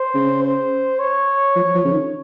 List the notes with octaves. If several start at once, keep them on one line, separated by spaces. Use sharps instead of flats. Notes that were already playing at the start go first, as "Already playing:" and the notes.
Already playing: C5
C#3
C5
C#5
F3
F3
C#3
D#3